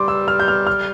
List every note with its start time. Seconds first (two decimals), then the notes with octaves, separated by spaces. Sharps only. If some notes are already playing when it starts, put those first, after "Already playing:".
Already playing: G3 C6 D6
0.08 E6
0.28 F6
0.40 G6
0.48 F6
0.67 F6